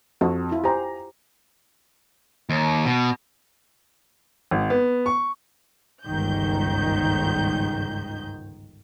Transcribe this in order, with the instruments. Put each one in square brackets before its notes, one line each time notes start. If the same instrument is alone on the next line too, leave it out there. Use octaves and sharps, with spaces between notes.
[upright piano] F2 [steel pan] F#4
[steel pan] E4 F4
[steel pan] G4 C5 [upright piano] G#5 A#5
[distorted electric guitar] D#2
B2
[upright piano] G#1
B3
C#6
[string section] G1 C#2 G#2 D#3 G6